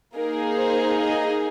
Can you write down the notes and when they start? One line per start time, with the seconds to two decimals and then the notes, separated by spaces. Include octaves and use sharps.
0.16 A#3 D#4 G#4 A#4
0.56 C5
0.98 D#5